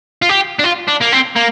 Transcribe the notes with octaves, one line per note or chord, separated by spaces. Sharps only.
F4
G4
D4
F4
D4
A#3
C4
A#3